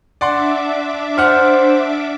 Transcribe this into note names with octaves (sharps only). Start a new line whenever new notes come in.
D4 D5 E5 F#5 C6 D6
C5 F#5 F6